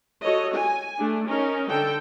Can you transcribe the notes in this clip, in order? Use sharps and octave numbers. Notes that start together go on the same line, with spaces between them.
F#4 A4 C#5 D#5
G#5
A3 D4
C#4 D#4 A#4
D3 A4 G5